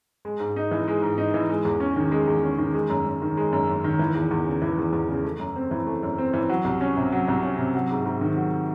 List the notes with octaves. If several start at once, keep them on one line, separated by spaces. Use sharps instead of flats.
G#3
G#2
D#4
E3
G#3
G#2
D#4
E3
G#3
E2
C#4
D#3
G#3
E2
C#4
D#3
G#3
F#2
F#2
D#3
G#3
F#2
F#2
D#3
E3
E2
E2
C#3
E3
E2
E2
C#3
A3
F#2
C4
E3
A3
F#2
C4
E3
F#3
C2
C#4
C3
F#3
C2
C#4
C3
F#3
G#2
G#2
D#3
F#3